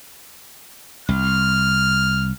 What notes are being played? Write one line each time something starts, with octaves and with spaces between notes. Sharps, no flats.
C2 F6